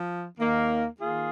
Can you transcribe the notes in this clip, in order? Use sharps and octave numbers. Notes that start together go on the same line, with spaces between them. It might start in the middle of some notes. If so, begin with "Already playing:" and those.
Already playing: F3
D#2 D#3 A#3
D#3 A#3 F4 G#4